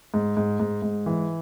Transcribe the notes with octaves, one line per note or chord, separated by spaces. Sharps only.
G#2
G#2
G#2
G#2
E3